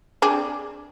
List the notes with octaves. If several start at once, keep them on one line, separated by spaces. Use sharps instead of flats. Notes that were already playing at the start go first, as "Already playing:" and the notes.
C4 D4 G#4